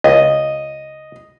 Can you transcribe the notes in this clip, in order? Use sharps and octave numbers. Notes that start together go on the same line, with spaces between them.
C#2 D#5